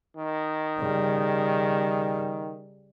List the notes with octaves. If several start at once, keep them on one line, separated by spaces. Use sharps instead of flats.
D#3
C#3 G3